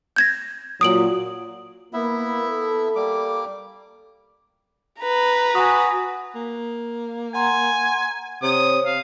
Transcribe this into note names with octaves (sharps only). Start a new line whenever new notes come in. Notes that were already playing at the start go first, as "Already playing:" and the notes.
G6 G#6 A#6
A#2 F#3 D#6 D7 F#7
A#3 B3 E4 E5
A4
G3 A#3 D6
B4 A#5
F#4 G#5 D#6
A#3
F#5 G#5 A#5 C6
C3 C5 C#5 D#6
C3 F5